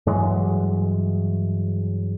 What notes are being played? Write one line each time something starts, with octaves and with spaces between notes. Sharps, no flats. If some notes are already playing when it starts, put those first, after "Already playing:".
G2 E3 F#3 G#3